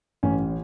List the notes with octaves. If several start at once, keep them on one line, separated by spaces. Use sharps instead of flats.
A1 C#4